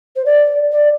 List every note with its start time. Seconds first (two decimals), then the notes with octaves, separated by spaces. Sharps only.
0.16 C5
0.25 D5
0.72 D5